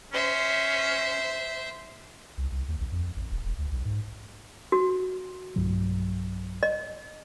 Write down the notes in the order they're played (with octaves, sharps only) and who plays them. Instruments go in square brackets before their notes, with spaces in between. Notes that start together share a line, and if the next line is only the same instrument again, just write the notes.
[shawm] C#4 [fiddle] C5 E5
[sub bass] C2
C2
D#2
A#1
F2
A1
D#1
E1
D2
B1
G#2
[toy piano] F#4
[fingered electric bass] B1 G2 F#3
[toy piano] D#5